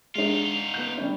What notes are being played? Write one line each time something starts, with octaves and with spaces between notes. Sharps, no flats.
G#3 D4 D#4 F4
B3 G6
G3 C#4 D4